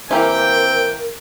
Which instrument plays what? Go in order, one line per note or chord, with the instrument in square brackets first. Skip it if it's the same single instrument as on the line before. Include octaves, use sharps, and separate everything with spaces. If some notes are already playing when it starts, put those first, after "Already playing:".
[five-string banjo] E3 A#3 G4 [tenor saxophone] C4 [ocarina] A#4 [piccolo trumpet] G5